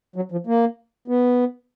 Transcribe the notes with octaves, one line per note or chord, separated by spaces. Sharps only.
F#3
F3
A#3
B3